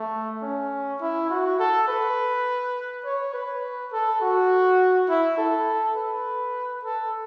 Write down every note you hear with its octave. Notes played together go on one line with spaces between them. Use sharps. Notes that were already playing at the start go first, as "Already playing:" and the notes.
Already playing: A3
C#4
E4
F#4
A4
B4
C#5
B4
A4
F#4
E4
A4
B4
A4